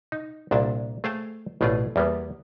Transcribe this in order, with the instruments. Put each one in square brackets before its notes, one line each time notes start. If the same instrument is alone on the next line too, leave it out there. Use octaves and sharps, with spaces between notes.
[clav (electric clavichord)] D#4
C2 A#2 D4 A5
A3 G#4 C5 F5 G5 A5
A1 B2 A3 F4 G#4 D5
E2 G3 A#3 B3